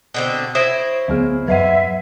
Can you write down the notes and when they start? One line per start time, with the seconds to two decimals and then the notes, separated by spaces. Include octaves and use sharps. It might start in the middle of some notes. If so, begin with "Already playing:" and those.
0.14 B2 D3 C4
0.55 E4 C5 C#5 D#6 A#6 D7
1.08 D2 F#3 B3 G#4
1.48 F#2 F#3 B4 D#5 E5 F#5